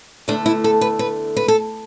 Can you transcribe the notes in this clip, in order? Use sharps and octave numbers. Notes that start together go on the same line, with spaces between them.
E2 D3 A3 D4
E4
A4
B4
B4
B4
A4